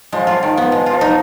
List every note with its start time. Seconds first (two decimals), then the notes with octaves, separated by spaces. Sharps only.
0.12 F3 G#3
0.21 F#3
0.27 F3 F4
0.43 D#3
0.57 B3
0.72 G#3
0.86 F4
0.92 F3
1.01 F#3 D#4